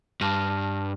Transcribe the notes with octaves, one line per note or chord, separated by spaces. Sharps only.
G2 A5 F6 A#6